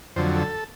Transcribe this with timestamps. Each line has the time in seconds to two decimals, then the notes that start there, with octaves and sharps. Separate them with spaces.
0.16 F2 D3 F#3 C5
0.35 A4